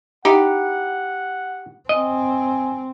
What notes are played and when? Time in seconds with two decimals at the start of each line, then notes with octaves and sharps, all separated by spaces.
0.25 D#4 E4 G4 F#5
1.89 C4 D#5 G#5